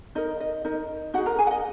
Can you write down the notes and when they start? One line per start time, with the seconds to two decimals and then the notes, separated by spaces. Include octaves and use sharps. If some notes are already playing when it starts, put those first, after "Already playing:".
0.15 D#4 A#4 D#5
0.40 D#5
0.65 D#4 A#4 D#5
1.14 D#4 F#4 G#4 F#5
1.26 A#4 A#5
1.39 G#4 G#5
1.47 F#5
1.51 D#5